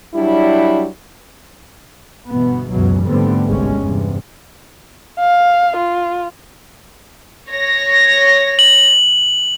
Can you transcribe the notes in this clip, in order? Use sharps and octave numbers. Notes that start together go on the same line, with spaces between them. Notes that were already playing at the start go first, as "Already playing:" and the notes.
F#3 G3 D4 E4
G1 B2 E3 B3
C#2 F#2 B2 E3 F#3
G#2 D3 G3 A3 B3 C4
G1 C2 G3 G#3 C#4
E2 G2 C3
F5
F4
C#5 A#6
F#7